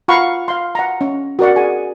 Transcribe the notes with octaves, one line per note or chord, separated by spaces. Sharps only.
F4 F5 F#5 A#5 B5 C#6
F5 C6
F#5 A#5
C#4
F#4 A#4 D5 F#5
G#4 G#5